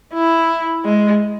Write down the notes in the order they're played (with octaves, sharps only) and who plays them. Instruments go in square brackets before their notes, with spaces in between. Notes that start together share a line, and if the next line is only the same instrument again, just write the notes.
[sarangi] E4
G#3